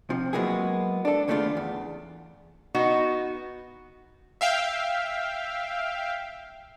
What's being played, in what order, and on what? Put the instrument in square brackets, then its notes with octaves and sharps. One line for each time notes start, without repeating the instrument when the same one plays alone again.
[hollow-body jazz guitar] C3 F3
F#3 G#3 A#3 B3 E4 G#4
D4 A4
D#2 C#3 A3 B3 D4 F4
E2
[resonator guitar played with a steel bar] B3 D#4 F#4
[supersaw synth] E5 F5 G5